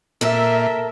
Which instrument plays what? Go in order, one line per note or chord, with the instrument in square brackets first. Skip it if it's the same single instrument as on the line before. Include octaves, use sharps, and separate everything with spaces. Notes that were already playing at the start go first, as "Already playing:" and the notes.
[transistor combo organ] A#2 [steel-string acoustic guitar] A4 A#4 [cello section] E5